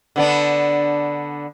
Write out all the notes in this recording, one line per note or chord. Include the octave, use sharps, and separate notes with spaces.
D3 B3 D4